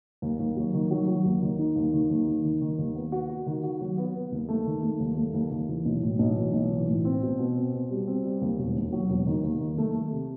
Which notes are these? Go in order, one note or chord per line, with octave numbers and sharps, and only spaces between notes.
D#2
D#2
F#3
D#3
F#3
F#3
D#2
D#3
D#4
D#2
D#3
D#2
D#4
D#3
D#3
D#2
B3
F#4
F#4
D#3
F#4
F#3
B3
B3
D#2
A3
D#3
A3
D#2
A3
D#2
D#2
E3
B1
A2
B1
E3
B1
E3
A2
C4
B2
B2
C4
B2
G3
C4
G3
D#2
E1
D#2
F#3
E1
D#3
D#2
D#3
A3
A3
C3